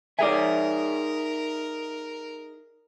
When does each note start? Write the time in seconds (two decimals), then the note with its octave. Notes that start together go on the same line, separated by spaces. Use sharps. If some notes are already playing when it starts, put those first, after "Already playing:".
0.19 D#4 G#4 A#4 D5 E5 G#5